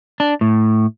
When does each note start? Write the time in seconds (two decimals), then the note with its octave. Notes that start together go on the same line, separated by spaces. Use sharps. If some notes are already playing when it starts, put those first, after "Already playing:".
0.20 D4
0.41 A2